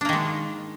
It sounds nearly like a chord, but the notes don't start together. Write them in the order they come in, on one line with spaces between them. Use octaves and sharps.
D4 A#3 D#3 G#3